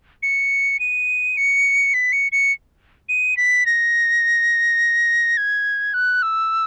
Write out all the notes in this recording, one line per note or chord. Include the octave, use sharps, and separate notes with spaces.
C#7
D#7
C#7
B6
C#7
C#7
D#7
B6
A#6
G#6
F#6
E6